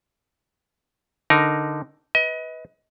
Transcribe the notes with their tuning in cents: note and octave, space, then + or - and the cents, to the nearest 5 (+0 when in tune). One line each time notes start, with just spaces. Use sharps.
D3 +0 D#4 +0 A#4 +10
B4 +0 D#5 +30